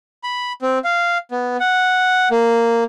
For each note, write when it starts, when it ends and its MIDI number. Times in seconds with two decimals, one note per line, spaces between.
0.23 0.52 83
0.62 0.79 60
0.84 1.18 77
1.31 1.57 59
1.60 2.29 78
2.31 2.84 58